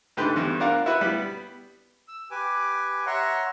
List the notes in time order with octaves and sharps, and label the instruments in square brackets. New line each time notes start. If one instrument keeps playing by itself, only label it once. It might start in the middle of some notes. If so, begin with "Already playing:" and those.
[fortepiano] G#2 D3 G4 B4 C6
E2 G2
D4 F4 A#4 F5 F#5
E4 F#4 B4
G3 B3
[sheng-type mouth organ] E6
G4 B4 G#5 D6
C#5 E5 F#5 A#5 C6 C#6